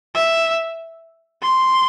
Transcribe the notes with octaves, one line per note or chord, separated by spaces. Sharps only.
E5
C6